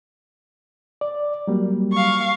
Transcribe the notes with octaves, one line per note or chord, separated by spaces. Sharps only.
D5
F#3 G3 A#3
F5 C#6